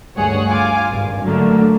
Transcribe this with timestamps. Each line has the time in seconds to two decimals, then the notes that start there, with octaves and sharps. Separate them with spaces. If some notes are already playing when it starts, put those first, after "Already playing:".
0.16 D2 G2 G#4 C#5 F#5
0.48 F4 F5 G#5 D6
0.88 G#1 G2
1.23 D3 F#3 A3 A#3